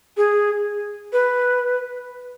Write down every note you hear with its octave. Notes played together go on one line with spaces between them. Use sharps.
G#4
B4